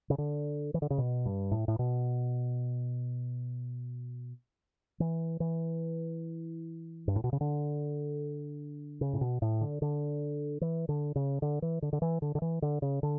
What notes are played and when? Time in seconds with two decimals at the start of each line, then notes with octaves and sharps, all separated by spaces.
0.10 C#3
0.18 D3
0.74 E3
0.82 D3
0.90 C#3
0.98 B2
1.26 G2
1.51 A2
1.68 A2
1.79 B2
5.00 E3
5.40 E3
7.08 G2
7.16 A2
7.24 B2
7.33 C#3
7.41 D3
9.01 C#3
9.13 A2
9.21 B2
9.42 A2
9.61 D3
9.82 D3
10.61 E3
10.89 D3
11.16 C#3
11.42 D3
11.62 E3
11.82 D3
11.93 D3
12.02 E3
12.22 D3
12.35 D3
12.42 E3
12.62 D3
12.82 C#3
13.03 D3